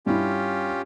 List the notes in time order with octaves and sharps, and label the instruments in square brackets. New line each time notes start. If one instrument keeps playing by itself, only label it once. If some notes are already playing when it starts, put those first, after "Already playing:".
[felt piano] G2 E4 [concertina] C#4 F4 G4